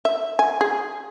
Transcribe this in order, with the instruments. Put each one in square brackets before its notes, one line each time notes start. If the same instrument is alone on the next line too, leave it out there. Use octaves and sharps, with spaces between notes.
[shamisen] E5
G#5
G#4